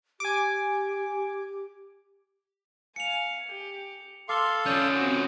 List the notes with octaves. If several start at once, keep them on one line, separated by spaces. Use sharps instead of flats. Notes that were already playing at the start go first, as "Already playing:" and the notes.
G4 G#5 D6
F5 G#5 C#7 F7
G4
A4 F5 C6 D6 G7
F3 C#4 D5 D#6 G6
C4 F#4